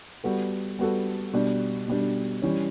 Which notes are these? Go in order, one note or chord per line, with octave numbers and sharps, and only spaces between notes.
G3 B3 F#4 A4
G3 B3 F#4 A4
B2 G3 D4
B2 G3 D4
E3 G3 C#4